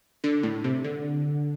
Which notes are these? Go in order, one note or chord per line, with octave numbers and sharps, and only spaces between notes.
D3
A2
C3
D3